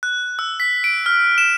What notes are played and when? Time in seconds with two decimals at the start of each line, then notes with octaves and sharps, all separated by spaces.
0.03 F#6
0.39 E6
0.60 B6
0.84 D7
1.06 F6
1.38 E7